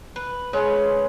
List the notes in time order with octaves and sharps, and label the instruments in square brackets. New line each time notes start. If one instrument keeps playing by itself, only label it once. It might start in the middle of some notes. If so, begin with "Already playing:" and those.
[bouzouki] B4
[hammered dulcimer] G#3 [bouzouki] C#4 B4